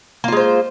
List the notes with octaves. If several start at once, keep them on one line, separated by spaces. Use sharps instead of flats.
G#3 A#3 F4 C5